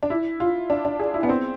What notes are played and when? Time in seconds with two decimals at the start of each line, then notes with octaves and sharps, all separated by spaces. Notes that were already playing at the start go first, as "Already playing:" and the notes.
0.03 D4
0.10 E4
0.40 F4
0.70 D4
0.85 D4
1.00 G#4
1.14 E4
1.23 B3
1.29 C4